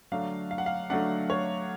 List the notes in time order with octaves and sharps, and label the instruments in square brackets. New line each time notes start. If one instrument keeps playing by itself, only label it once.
[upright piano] D3 F#3 A3 D4 F5
F5
F#5
F5
D3 F#3 A3 D4 F#5
C#5